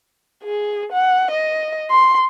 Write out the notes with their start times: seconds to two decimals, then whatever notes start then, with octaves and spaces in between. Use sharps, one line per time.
0.44 G#4
0.92 F#5
1.31 D#5
1.91 C6